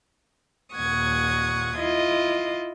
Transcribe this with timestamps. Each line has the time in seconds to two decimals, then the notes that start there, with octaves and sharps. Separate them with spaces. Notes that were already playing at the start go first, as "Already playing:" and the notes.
0.76 D#2 A#2 F#5 C#6 D#6 G#6
1.78 E4 F4 D#5